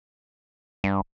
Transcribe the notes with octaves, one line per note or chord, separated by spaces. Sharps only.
G2